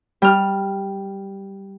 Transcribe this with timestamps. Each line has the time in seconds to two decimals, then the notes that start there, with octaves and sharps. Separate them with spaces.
0.22 G3 F6